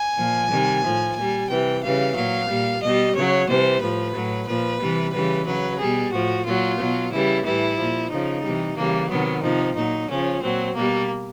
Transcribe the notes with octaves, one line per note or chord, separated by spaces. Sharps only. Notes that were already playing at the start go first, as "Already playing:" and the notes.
Already playing: G#5
A#2 F3
C3 D#3 G3
A2 F3
A#2 G3 G#5
C3 E3 G3 G5
C#3 E3 G3 F5
A#2 F#3 F5
A#2 G3
B2 G3 D#5
C#3 F#3 C#5
C3 E3 G3 C5
A2 F3 B4
A2 F#3
A#2 F3 B4
C3 E3 G3
C#3 E3 G3 B4
C#3 F#3 B4
B2 G3 G#4
A2 F3 F#4
A#2 F#3 F4
B2 F#3
C#3 E3 G3 E4
A2 E3 G3 E4
A#2 F3
C#3 F3 D#4
C3 E3 G3
C#3 E3 G3 A#3
C3 D#3 F#3 B3
C3 F3 D#4
A#2 F#3 D#4
C#3 F3 C#4
A#2 F#3 C4
B2 G3 A#3